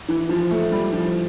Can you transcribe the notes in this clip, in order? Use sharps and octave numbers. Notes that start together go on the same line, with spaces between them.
E3
F3
A3
G3
F3